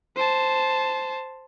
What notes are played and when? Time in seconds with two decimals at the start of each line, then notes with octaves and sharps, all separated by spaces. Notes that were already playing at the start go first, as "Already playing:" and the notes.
0.16 C5 A5